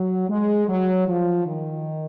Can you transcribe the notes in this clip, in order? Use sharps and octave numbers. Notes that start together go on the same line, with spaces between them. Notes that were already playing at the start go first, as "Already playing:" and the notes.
Already playing: F#3
G#3
F#3
F3
D#3